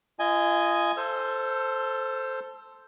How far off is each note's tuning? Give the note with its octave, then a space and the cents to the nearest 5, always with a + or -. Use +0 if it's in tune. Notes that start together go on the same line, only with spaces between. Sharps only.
F4 -35 D#5 +0 G#5 +0
A4 +0 C5 +0 E6 +35